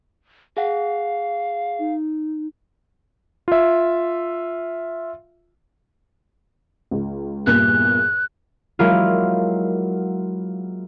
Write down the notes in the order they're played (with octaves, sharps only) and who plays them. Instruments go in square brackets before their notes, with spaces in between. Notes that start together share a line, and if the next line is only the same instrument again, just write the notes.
[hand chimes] G#4 F#5 [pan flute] F5
[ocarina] D#4
[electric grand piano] F4 E5
[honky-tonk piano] C#2
[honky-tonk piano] E2 G2 A#2 [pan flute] F#6
[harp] F#3 G#3 A#3 E4 F4